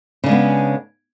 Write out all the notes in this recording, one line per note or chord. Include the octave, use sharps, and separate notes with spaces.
C#3 G#3 B3 D4